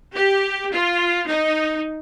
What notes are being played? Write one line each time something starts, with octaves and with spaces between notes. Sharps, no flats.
G4
F4
D#4